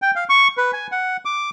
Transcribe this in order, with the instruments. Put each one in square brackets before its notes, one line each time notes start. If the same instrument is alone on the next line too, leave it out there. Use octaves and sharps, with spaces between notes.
[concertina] G5
F5
C#6
B4
G#5
F#5
D6